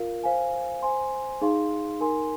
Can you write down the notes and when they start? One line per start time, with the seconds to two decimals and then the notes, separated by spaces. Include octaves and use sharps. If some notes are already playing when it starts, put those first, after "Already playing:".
Already playing: F4 A#4 F5
0.24 C5 F5 G#5
0.83 C5 G#5 C6
1.42 D#4 G#4 F5 C6
2.00 D#4 A#4 G#5 C6